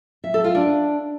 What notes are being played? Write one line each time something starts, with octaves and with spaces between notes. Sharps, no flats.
E5
A4
F4
D4